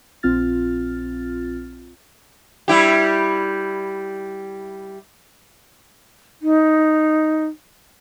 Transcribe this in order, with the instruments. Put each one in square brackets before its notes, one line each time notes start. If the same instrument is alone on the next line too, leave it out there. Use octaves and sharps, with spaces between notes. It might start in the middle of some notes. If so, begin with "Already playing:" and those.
[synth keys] A#1 C4 F4 F6 A6
[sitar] G3 E4 G4
[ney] D#4